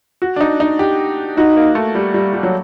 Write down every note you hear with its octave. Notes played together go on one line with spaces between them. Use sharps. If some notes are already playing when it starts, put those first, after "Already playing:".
F#4
D4
D#4
D#4
G4
D#4 F#4
A#3
A3
G3
G3
G3
F#3